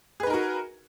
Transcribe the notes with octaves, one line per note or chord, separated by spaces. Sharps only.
D#4 F#4 G#4 A#4 B4